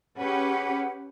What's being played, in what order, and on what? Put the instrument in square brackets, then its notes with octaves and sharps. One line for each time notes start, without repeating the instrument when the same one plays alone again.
[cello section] C#4 G4 B4 [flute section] G#4 F#5